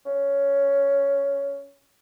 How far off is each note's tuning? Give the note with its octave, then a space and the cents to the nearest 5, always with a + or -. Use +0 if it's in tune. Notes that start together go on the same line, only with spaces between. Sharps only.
C#4 +10